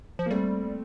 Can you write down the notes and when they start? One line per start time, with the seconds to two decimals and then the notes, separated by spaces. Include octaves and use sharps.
0.19 F3
0.26 A#3
0.31 G3 A3 C4